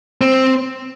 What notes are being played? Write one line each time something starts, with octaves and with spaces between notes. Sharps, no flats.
C4